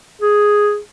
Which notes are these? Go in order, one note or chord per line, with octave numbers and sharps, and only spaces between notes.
G#4